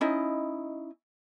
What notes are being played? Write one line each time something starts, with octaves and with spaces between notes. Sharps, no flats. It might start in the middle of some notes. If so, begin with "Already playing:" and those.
C#4 D#4 E4 D#5